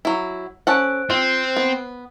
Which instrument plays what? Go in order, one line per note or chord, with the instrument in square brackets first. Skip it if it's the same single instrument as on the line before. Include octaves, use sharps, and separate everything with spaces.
[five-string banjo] F#3 E4
[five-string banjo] C#4 A4 F#5 [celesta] C5 F#6 D7
[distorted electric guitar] C4 [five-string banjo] F4
[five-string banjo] B3